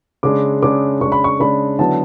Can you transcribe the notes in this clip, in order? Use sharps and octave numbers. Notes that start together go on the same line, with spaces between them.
C#3 G#3 D4 D6
C#3 G#3 D4 D6
C#3 G#3 D4 C#6
B5
C#6
C#3 G#3 D4 B5
D3 F#3 B3 E4 A5